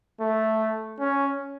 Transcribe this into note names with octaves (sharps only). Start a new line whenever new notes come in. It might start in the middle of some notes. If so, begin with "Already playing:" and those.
A3
C#4